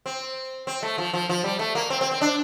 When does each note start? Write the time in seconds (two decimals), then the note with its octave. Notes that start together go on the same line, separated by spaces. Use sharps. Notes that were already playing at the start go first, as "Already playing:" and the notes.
0.06 C4
0.67 C4
0.83 A3
0.98 F3
1.13 F3
1.29 F3
1.44 G3
1.59 A3
1.75 A#3
1.90 C4
2.01 C4
2.11 C4
2.21 D4